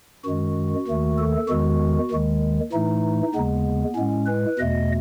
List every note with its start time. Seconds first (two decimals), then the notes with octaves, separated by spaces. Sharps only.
0.25 F#2 D#3 G#3 F#4
0.87 D#2 D#3 A3
1.18 A4
1.49 E2 D#3 G#3 F#4
2.11 D#2 D#3 G#3
2.72 A2 E3 A3 D#4
3.35 D#2 C#3 G#3 B3
3.96 A2 G#3 C#4
4.27 B4
4.59 E2 B2 A3 D#5